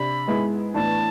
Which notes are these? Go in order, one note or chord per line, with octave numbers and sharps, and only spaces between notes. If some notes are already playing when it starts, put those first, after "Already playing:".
Already playing: C3 D4 B5
G#2 G#3 B3 E4 G#4
A2 E3 B3 D4 A5